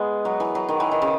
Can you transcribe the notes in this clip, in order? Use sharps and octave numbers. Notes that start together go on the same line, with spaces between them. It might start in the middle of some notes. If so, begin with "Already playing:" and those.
Already playing: G#3 B3
F#3
E3
F#3
D#3
E3
D#3
C#3